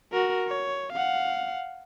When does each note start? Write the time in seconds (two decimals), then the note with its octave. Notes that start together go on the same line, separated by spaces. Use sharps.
0.12 F#4 A#4
0.48 C#5
0.92 F5 F#5